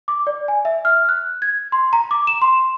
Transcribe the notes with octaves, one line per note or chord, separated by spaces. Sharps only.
D6
D5
G#5
E5
F6
F#6
G#6
C6
A#5
D6
E7
C6